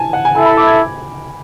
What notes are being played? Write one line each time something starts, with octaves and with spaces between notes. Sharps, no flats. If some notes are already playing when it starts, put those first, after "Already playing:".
Already playing: G#5 A5
F#5
G#5
E4 A4 E5 G#5
B5
D6
G#6